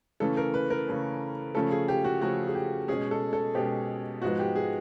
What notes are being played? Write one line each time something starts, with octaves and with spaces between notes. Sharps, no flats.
C#3 E3 A3 C#4 A4
A#4
B4
A#4
C#3 E3 A3 C#4
C#3 F3 A3 C#4 A4
G#4
G4
F#4
C#3 F3 A3 C#4 F#4
G#4
G4
B2 G#3 C#4 G#4
A4
A4
B2 G#3 C#4 G4
G#2 F3 G#3 B3 F#4
G4
G#4